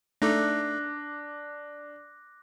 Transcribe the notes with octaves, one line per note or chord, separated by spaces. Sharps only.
A3 D4 D#4 A4 D6 F#6 A#6